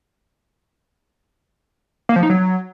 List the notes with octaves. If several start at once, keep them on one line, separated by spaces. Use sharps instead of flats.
A#3
F3
D#4
F#3